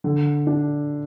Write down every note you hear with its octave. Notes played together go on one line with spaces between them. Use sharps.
D3
D4